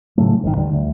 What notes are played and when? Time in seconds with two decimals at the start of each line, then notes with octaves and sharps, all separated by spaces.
0.18 A2 C#3 F#3 A3
0.44 A1 G#2 B2 D#3
0.57 D#2 D3 G3
0.73 D2